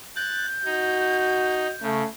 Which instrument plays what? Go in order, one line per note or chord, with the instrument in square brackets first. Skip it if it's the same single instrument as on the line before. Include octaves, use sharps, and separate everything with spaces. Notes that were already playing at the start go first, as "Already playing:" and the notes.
[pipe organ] F#6 A6 [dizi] G6
[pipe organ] D#4 [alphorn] F#4
[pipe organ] C#3 [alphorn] A3